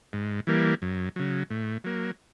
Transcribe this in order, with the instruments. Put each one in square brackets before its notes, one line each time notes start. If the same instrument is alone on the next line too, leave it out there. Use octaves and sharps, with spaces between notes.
[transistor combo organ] G#2
E3 G3 A#3
F#2
C#3 F#3
A2
F#3 A#3